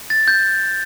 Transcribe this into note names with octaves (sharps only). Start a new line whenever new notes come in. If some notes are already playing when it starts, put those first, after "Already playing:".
A6
G6